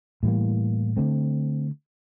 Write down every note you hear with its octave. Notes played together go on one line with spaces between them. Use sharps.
A2 E3 G3 A#3
D3 A3 C4